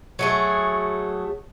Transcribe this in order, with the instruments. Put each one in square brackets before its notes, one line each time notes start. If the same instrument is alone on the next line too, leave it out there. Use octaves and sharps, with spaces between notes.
[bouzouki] F#3 A3 G#4